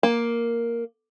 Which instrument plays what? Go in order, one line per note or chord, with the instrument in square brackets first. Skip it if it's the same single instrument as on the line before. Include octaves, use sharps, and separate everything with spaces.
[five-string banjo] A#3